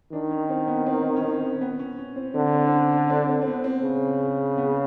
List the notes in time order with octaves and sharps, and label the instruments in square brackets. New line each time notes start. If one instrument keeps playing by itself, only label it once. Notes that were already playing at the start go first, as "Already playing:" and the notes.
[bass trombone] D#3 [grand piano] D4
[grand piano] C#4
C4
B3
C4
C#4
C4
B3
C#4
C#4
C4
[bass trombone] D3 [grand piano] C4
[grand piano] C4
D4
C#4
C4
C4
C4
B3
C4
[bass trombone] C#3
[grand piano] B3